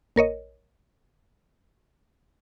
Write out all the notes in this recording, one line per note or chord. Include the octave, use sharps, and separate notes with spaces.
A#1 A#4 C#5 D#5